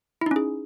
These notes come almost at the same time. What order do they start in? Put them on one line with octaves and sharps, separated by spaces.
E4 D#4 C#4 G#4